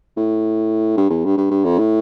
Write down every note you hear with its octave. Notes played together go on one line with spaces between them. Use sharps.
A2
G2
E2
G2
G2
G2
F2
A2